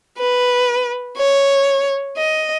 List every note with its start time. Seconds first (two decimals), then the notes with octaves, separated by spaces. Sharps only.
0.18 B4
1.17 C#5
2.18 D#5